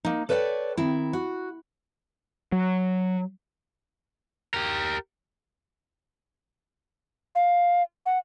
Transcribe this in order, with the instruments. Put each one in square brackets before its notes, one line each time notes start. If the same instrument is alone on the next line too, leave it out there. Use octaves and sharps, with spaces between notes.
[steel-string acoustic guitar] A#3 D#4
A4 B4 C#5 D5 F5 G5
D#3 C4 E4
F#4
[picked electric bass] F#3
[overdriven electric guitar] G4 A#4
[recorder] F5
F#5